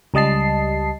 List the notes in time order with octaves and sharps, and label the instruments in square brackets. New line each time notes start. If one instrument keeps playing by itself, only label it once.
[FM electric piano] C#2 G3 D#5 A5 C7